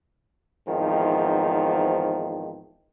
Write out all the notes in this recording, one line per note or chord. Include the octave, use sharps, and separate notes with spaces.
E2 G#2 D#3 F3 C4